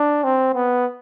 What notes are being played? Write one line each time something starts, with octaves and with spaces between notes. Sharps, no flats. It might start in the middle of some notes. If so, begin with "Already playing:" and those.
Already playing: D4
C4
B3